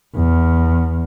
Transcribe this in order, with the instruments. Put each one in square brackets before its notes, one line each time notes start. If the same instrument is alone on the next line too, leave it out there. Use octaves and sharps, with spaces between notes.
[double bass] E2